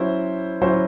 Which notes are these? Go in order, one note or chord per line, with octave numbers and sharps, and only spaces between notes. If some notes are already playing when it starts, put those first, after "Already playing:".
Already playing: F#3 C#4 E4 C5
F#3 C#4 E4 C5